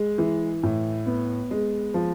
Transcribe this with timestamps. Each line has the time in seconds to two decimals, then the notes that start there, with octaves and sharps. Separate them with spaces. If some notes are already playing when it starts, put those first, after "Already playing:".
Already playing: G#3
0.18 E3
0.63 A2
1.06 B3
1.51 G#3
1.94 F3